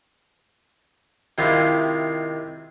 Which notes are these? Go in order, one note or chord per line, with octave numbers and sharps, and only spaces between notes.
C3 D#3 G#3 E4 F4